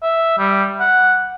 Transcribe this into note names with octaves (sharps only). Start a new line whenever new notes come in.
E5
G3
F#5